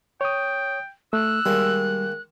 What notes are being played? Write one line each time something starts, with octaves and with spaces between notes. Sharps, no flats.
C#5 G5 D#6
A3 E6 F#6
D#3 G3 G#3 A#3